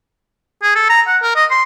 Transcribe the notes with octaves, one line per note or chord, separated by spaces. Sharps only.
G#4
A4
A#5
F#5
A#4
D#5
C6